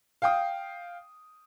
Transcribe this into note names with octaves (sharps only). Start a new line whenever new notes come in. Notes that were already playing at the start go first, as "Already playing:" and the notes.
F5 G5 D#6